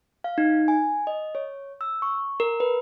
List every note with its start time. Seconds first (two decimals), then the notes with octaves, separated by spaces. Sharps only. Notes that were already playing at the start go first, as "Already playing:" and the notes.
0.24 F5
0.38 D#4
0.68 G#5
1.07 D#5
1.35 C#5
1.81 E6
2.02 C#6
2.40 A#4
2.60 B4